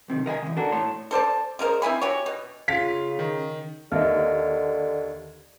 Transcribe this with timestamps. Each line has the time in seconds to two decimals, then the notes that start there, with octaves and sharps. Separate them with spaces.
0.08 B1 C3 D#3
0.26 A#4 D#5 F#5 G#5
0.42 E2 C#3
0.57 D4 F#4 A4 A#4
0.72 A2 C#5 A5 C6
1.11 A4 C5 D5 A5
1.59 C#3 G#3 A#4 C5
1.82 C4 E4 G#5 B5
2.01 F#4 G4 C#5
2.26 B2
2.68 C#3 F4 F5 B6
3.19 D#3
3.92 D#2 D3 D#5 E5 F6